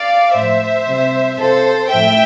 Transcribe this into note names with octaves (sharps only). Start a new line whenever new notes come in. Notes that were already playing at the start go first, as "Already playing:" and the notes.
Already playing: D5 F5
A2 F3 C5 E5
C3 G3
C3 F3 A4 C5
A2 F3 E5 G5